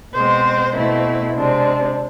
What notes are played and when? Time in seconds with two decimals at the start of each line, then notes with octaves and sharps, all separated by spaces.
0.14 B2 G#3 C4 C5
0.74 B2 A3 C4 E4
1.36 C3 G#3 C4 D4